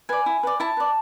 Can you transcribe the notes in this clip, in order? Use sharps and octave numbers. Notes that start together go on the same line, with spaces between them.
B4 D5 G#5
E4
B4 D5
E4 A5
B4 D5